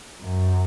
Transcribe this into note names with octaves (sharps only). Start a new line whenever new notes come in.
F#2